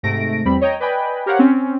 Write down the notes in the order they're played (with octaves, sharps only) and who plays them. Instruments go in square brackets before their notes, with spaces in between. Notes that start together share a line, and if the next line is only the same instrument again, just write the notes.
[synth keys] G#2 C3 A3 A#6 D7
E2 G3 C4 B5
C#5 D#5 G5 A#5
B4 D5 D#5 G5 G#5 B5
G4 A#4 C5 C#5 F5 F#5
C4 C#4